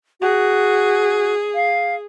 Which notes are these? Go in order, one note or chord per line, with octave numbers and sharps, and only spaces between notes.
F#4 G#4
F5